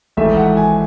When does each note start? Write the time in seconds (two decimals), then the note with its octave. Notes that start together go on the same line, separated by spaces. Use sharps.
0.17 G#1 G#2 E3 A3 E5
0.37 F#5
0.57 G#5